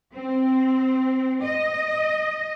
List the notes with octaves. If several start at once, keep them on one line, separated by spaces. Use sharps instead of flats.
C4
D#5